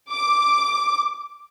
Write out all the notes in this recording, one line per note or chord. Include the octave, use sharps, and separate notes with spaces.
D6